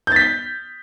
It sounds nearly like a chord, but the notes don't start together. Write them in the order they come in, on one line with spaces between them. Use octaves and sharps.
G6 A6 B6